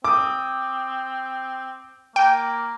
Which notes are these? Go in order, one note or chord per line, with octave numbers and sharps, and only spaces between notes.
C4 D6 D#6
A#3 G5